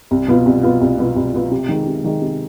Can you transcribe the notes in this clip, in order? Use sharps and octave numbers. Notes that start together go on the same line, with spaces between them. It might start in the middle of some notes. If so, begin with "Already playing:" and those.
C2
B2 B3 F4
C2
B2 B3 F4
C2
B2 B3 F4
C2
B2 B3 F4
C3
D#3 G#3
C3
D#3 G#3
C3